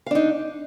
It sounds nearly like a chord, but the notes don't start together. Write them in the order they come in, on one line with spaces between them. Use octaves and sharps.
F5 D4 D#4